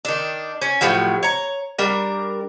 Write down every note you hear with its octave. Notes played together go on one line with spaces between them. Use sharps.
D#3 D4
C#4
A2 C3 F3 F#3
C#5 A#5
G3 D4 A#4